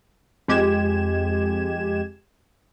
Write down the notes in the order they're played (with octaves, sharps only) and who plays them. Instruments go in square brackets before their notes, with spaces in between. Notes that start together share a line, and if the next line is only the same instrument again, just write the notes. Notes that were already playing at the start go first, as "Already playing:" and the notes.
[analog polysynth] F2 G#3 G4 G#6 E7